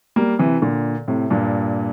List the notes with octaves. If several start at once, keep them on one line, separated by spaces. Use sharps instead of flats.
G3 A#3
C3 E3
A#2 D3
A2 C3
G2 A#2